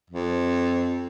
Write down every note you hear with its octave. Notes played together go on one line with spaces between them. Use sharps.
F2